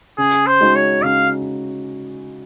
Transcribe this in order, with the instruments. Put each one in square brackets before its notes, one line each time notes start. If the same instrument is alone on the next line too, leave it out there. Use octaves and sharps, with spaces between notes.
[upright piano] C#3 [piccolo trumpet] G#4
[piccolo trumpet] C5
[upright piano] G#3 D#4 F#4
[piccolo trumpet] C#5
[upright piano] C#3 [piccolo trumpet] F5